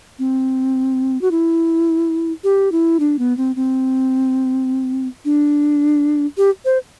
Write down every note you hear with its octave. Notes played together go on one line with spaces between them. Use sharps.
C4
F#4
E4
G4
E4
D4
B3
C4
C4
D4
G4
C5